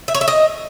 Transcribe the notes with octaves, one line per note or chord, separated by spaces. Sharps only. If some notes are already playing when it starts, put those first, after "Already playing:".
E5
C#5
E5
D#5